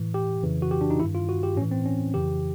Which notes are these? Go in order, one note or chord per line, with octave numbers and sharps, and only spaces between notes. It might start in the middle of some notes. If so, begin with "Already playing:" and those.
Already playing: A2 E3
G4
F2 C#3 E3
F#4
G4
D4
D#4
G2 D#3 E4
F4
F#4
G4
A2 E3 C#4
C4
C#4
F2 C#3 E3 G4